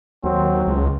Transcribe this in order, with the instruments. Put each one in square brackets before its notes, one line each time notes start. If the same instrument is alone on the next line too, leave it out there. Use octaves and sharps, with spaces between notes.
[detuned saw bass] D#2 [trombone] F#3 [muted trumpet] C4
[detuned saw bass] C#2